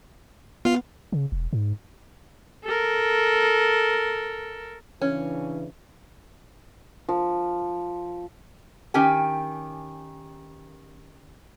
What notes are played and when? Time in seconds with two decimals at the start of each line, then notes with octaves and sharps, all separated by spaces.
0.65 B3 F4 F5
1.12 C#3
1.32 E1
1.53 G#2
2.64 A4 A#4
5.02 C#3 E3 C#4 D4
7.09 F3
8.94 D#3 C#4 G4 G5 G#5